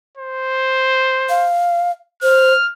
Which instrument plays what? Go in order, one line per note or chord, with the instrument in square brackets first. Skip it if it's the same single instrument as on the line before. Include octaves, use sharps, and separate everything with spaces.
[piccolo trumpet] C5
[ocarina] F5
[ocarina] C5 [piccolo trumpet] F6